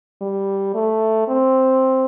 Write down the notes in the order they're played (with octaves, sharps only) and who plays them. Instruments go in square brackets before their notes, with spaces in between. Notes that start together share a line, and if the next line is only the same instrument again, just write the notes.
[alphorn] G3
A3
C4